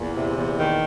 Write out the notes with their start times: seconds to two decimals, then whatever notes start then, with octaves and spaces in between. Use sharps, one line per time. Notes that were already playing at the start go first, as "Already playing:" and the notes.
Already playing: E2 A#2
0.15 C3
0.36 E2
0.57 D#3